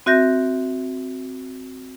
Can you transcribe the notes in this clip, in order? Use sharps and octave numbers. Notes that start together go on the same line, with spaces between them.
C4 F#4 E5 G6 A#6